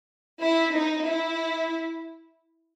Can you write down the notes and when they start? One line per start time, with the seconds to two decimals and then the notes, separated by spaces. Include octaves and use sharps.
0.41 E4
0.74 D#4
1.06 E4